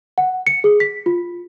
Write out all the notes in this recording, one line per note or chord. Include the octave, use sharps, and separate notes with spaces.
F#5
C#7
G#4
B6
F4